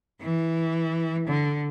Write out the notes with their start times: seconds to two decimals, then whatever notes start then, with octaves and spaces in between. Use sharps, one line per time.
0.22 E3
1.27 D3